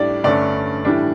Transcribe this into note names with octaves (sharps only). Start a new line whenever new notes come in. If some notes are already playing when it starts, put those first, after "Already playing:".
Already playing: A2 G3 D4 D5
G2 D3 A3 C#4 D5
A2 E3 G3 D4